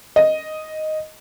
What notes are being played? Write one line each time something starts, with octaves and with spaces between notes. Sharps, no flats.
D#5